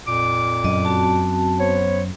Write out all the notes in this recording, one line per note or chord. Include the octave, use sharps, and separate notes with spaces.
F2 A#2 D6
F#2 D#5
C4 F#4 A5
B3 C5 C#5